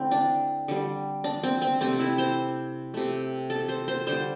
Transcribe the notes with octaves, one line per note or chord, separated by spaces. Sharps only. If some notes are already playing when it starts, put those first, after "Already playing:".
Already playing: D3 A3 C4 E4
D4
D3 G3
D4
C4
C4
C3 A3 C4
E4
C5
C3 A3
A4
C5
C5
D3 G3 C5